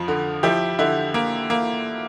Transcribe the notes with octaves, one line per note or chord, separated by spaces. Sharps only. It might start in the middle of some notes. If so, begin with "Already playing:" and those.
Already playing: F2 F3
D3
F3 E4 G4
D3 E4
A#3
A#3